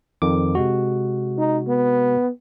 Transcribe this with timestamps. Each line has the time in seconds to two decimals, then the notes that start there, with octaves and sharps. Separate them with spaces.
0.22 F2 D#3 D6
0.55 C3 G#3 F#4
1.38 D#4
1.68 B3